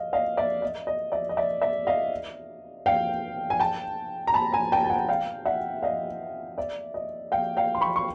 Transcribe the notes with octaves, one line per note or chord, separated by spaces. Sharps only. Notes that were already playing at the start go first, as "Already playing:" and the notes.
Already playing: D#5 F5
D#5 F5
D5 E5
D#5
D#5
D5 E5
D#5
D5 E5
D5 E5
D#5 F5
F5 G5
G#5
G5 A5
A#5
A5 B5
G#5 A#5
G5 A5
A5
F#5 G#5
F5 G5
E5 F#5
D#5 F5
D5 E5
D#5
F5 G5
F5 G5
C6
B5 C#6
C#6